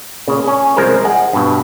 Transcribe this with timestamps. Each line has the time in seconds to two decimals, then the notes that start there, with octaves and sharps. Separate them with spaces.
0.27 A#2 C#3
0.47 C#4 C#5
0.76 C2 F3 G#3 A#4 C5
1.04 G#4 D#5 F#5
1.33 G2 B2